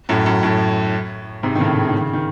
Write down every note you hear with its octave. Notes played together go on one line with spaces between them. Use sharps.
F#2 A2
F#2
F#2 A2
G#2 C3
D#3
A2 C#3
C#3
D#3
C#3
D#3